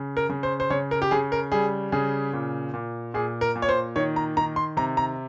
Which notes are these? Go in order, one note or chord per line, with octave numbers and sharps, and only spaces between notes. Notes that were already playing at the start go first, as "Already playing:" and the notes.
Already playing: C#3
A#4
C#3
C5
C5
C#3 C#5
A#4
G4
C#3 G#4
A#4
G3 G#4
C#3 G#4
A#2
A#2
A#2 G#4
A#4
A#2
C#5
C5
D#3 C#5
A#5
D#3 A#5
C6
C3 A#5
A#5